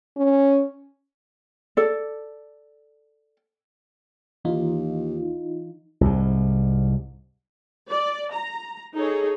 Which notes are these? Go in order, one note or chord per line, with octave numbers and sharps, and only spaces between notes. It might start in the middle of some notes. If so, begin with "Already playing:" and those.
C#4
A4 D5
D#2 E3 D#4 F4
C2 G#2
D5
A#5
D#4 G#4 A4 C#5